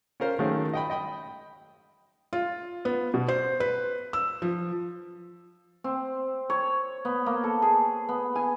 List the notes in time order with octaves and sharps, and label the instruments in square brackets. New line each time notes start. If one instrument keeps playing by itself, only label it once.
[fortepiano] C#4 F4 A#4 C5
D#3 F#3 G#3 A3 C#4 F4
D#5 G5 B5
D#5 G5 B5
[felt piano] F4
B3
B2
C5
B4
E6
F3
[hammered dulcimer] C4
C#5
B3
A#3
A4
G#4
B3
G#5